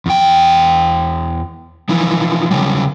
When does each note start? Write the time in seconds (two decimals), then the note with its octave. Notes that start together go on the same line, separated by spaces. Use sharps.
0.06 E2 G5
1.89 E3 F3 D#4 E4
2.51 C#3 F#3 G3